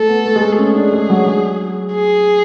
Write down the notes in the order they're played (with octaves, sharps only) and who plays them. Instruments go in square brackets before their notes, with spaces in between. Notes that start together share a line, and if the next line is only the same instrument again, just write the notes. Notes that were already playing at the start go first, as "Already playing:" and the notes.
Already playing: [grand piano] A3 [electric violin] A4
[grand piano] B3
A3
G#3
A3
[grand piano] C#4 [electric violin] G#4
[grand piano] D4
G#3
F#3
F#3
[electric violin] G#4